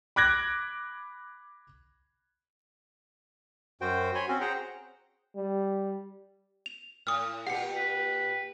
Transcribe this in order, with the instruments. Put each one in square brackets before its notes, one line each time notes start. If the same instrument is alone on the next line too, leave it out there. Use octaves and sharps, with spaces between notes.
[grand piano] B5 D6 F#6 G#6 A#6
[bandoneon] F#2 F#4 C5 G5
C#5 G#5 B5 C6
C4 C#4 F#4
G#4 C5 F#5 G5 A#5
[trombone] G3
[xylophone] F7
[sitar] A2 [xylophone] D#6 F6
[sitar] A#2 G4 [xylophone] F#5 C#7
[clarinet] B4